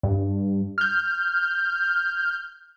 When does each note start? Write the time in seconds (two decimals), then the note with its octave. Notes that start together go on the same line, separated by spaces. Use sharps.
0.03 G2
0.78 F6 G6